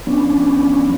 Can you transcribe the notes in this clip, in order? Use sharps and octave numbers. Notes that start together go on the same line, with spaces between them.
F3 B3 C#4 D4